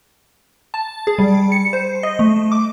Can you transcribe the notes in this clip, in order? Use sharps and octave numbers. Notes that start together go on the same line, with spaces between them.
A5
G#4
G3
C#7
C5
D#5
A3
D6